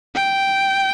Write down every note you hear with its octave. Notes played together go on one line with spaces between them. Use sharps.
G5